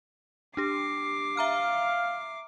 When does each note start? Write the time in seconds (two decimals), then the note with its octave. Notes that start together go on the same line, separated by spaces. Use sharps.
0.57 D4 G4 D6 C7
1.37 E5 F5 A#5 F6